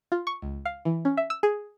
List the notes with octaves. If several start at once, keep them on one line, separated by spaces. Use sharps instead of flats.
F4
C#6
C#2
F5
E3
C#4
E5
E6
G#4